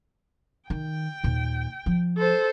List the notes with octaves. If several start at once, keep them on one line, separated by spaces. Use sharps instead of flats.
D#3 G5
D#2 A#2
F3
A4 C5